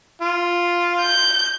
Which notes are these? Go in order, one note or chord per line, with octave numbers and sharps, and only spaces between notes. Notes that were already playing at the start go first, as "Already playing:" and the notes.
F4
G6